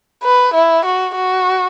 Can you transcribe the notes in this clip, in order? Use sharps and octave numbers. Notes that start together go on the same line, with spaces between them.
B4
E4
F#4
F#4